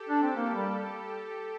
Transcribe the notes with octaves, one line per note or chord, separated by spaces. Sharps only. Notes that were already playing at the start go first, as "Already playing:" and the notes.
Already playing: G4 A4
D4
C4
A#3
G3